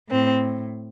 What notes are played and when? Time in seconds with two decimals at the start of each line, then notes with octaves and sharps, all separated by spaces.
0.11 A2 C4